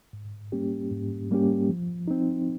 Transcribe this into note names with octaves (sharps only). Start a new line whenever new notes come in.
G#2
G3 A#3 C#4 G4
G#2
G3 A#3 C#4 G4
F3
C4 D#4